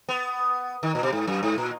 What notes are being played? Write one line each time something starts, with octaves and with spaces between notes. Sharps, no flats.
B3
D#3
A#2
B2
G#2
F#2
G#2
A#2